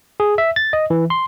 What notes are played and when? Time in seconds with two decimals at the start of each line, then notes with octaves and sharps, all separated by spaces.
0.20 G#4
0.38 E5
0.56 A6
0.73 D#5
0.90 E3
1.10 C6